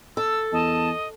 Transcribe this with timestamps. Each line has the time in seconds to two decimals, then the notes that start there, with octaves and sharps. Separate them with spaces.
0.17 A4 E6
0.53 E2 D#5 A5